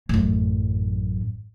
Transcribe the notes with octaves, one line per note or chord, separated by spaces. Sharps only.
A1 F#2